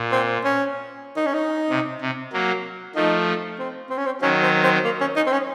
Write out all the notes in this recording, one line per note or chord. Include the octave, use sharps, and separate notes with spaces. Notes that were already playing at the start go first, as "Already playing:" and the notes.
Already playing: A#2
C4
C#4
D#4
C#4
D#4
C3
C3
F#3 A#3
F3 A3 D#4
C4
C4
C#4
C4
D#3 F#3 C#4
C4
C4
A#3
C#4
D#4
C4
C#4